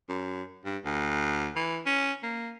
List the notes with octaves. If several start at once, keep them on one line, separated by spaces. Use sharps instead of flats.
F#2
G2
D2
E3
C#4
A#3